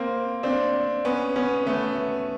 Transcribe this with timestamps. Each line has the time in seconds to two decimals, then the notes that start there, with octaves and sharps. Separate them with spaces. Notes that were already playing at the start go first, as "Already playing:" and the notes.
Already playing: A#3 C4
0.43 C4 D4
1.05 B3 C#4
1.36 B3 C#4
1.67 A3 B3